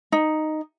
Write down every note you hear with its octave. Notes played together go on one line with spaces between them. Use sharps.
D#4